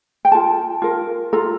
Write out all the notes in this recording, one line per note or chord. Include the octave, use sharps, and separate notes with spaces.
G5
F4 A4 A5
F4 A#4
F4 A4 A#5